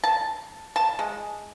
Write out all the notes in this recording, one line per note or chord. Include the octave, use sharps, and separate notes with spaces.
A5
A5
G#3